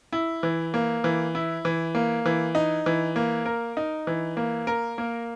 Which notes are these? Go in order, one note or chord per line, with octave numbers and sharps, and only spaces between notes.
E4
E3
A#3
E3
E4
E3
A#3
E3
D#4
E3
A#3
A#4
D#4
E3
A#3
A#4
A#3